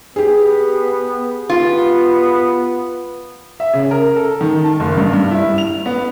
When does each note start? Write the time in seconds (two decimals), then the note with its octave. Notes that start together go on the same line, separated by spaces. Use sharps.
0.16 B3 G4 G#4
1.50 B3 F4
3.60 E5
3.73 C#3
3.91 A#4
4.16 A4
4.41 D#3
4.64 A5
4.80 F#1
4.97 G2
5.13 G2
5.31 E4
5.58 F7
5.86 B3